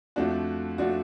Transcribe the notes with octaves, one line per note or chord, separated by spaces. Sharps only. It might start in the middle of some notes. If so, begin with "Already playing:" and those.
F2 F3 A3 D4 F#4
F3 A3 D4 F#4